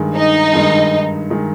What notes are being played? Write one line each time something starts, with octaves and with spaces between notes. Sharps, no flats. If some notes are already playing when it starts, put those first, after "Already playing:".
Already playing: G2 D#3 G#3
D#4
G2 D#3 G#3
D#3 G#3